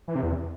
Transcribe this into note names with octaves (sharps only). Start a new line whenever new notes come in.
E3
C3
E2